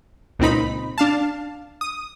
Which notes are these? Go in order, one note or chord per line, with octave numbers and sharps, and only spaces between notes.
C#2 A#2 C4 D#4 B5
D4 F5 A5
D#6